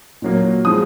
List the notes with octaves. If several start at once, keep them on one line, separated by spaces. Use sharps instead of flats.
A#2 F#3 A#3
F3 G#3 D#6